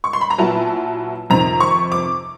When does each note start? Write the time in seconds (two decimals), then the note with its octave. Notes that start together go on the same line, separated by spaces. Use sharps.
0.04 C#6
0.13 C6
0.21 B5
0.30 A#5
0.38 A#2 F#3 B3 E4 A5
1.30 F2 C3 D#3 A#5
1.60 C#6
1.92 D6